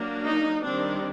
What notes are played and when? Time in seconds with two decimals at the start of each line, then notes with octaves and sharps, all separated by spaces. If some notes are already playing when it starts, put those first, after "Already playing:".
Already playing: F#3 A#3 D4
0.26 D#4
0.63 D#3 G3 C4 D4